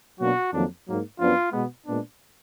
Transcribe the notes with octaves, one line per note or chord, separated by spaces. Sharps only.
B2 F#3 A#3 D4 F#4
F2 D#3 F#3 A#3 D4
G#2 F#3 A#3
F#2 F3 B3 D4 F4
B2 G#3 B3
A#2 G#3 B3 D4